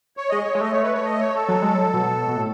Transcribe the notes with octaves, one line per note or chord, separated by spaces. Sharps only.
C#5
G#3 D#5
C#5
G#3
A3 D#5
C#5
B4
C#5
D#5
C#5
A4
F#3
G#3
F#3
B2
B2
A2